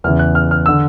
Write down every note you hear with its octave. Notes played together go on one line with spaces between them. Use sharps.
E2 C#3 E3 F6
F#6
F6
F6
D3 E6